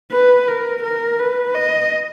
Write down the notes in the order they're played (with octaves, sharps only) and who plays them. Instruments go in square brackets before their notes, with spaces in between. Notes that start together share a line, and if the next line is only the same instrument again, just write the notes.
[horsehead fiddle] B4
A#4
A#4
B4
D#5